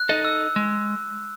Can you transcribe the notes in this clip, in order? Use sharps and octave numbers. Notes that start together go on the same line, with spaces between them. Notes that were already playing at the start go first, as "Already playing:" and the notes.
Already playing: F#6
D#4 A4 D#5
E6
G#3